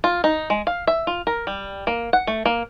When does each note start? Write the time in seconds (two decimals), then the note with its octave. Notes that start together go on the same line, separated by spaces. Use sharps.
0.04 F4
0.24 D#4
0.50 G#3
0.67 F5
0.87 E5
1.07 F4
1.27 A#4
1.47 G3
1.87 A#3
2.13 F#5
2.27 A3
2.45 A#3